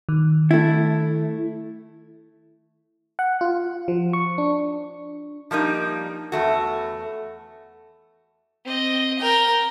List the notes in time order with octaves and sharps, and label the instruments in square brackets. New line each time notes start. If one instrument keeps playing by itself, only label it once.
[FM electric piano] D#3
[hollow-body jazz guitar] A3 E4
[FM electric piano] F#5
F4
F3
C#6
D4
[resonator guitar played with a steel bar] F3 G3 A#3 D#4
E2 A3 F#4
[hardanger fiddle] C4 D#5
A#4 G5